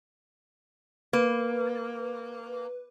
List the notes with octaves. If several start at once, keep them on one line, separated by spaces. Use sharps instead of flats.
A#3 B4